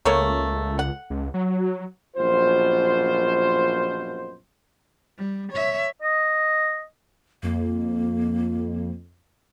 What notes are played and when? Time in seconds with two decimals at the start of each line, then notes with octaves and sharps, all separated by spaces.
0.05 C#2 A3 A#3 C#5
0.79 F#5
1.10 C#2
1.34 F#3
2.17 A#1 F#2 B2 F4 C5
5.18 G3
5.52 C#5 E5
6.02 D#5
7.43 F2 A#3